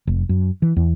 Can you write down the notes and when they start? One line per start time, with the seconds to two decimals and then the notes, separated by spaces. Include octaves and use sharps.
0.07 F1
0.29 F#2
0.62 E3
0.77 E2